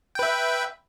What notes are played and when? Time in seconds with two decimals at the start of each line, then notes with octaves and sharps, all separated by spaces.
0.15 G5
0.19 B4
0.23 E5